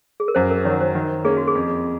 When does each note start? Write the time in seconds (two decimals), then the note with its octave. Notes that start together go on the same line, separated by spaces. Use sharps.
0.20 G#4
0.28 A#4
0.35 F#2 C5
0.51 A#4
0.65 D#3 C#5
0.69 F#3
0.80 C5
0.95 D#3
1.24 A#3 C#4 G#4
1.37 F#4
1.48 G#4
1.55 F2